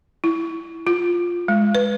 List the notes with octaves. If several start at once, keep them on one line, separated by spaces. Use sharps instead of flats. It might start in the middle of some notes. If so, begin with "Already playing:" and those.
E4
F4
G#3
B4